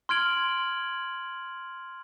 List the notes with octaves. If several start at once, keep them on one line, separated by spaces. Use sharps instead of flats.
C6 F6 G#6 D7 F#7